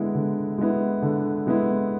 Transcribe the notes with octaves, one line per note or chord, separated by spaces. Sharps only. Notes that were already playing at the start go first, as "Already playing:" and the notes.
Already playing: D3 G#3 B3 E4
D3
G#3 B3 E4
D3
G#3 B3 E4